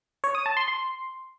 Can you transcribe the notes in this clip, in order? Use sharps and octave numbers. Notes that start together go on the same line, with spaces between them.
C#5
D#6
A5
C6
C6